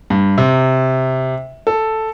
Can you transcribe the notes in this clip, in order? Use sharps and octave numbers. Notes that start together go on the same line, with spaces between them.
G2
C3
A4